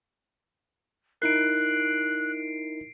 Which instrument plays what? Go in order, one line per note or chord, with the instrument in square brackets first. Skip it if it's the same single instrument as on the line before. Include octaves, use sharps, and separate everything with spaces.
[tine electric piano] D#4 E4 A#4 [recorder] F#6 [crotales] C7 D7